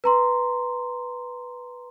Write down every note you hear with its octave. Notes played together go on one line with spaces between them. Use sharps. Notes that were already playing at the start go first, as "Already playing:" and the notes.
B4 A#5 C6